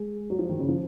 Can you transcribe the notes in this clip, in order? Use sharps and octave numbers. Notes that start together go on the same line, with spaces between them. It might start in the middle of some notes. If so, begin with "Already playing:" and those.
Already playing: G#3
F#3
F3
D#3
C#3
F3